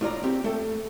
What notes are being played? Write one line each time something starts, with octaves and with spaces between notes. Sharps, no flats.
A2 F4 D5 A#5
C4 G4
A3 A4